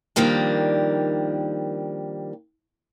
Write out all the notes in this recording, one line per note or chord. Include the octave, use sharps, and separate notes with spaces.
D#3 F3 G3 A#3 D4